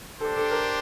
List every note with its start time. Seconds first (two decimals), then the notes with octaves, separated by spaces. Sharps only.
0.20 D4 G4 A4 C5
0.36 A4
0.51 A#4